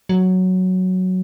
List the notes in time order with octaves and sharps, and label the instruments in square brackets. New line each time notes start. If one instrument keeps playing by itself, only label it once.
[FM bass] F#3